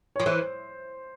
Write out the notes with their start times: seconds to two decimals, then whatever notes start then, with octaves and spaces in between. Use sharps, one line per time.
0.16 F3 C#5
0.26 E3 C5